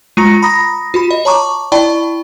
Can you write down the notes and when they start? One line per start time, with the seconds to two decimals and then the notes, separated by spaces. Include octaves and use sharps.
0.17 G#3 F4 A#5 A#6 C#7
0.42 A#5 B5 D#6 A#6
0.94 F4 F#4 B5
1.11 D#5
1.25 C#5 A5 A#5 C#6 D6
1.72 E4 D5 G5 A5 B5 C#6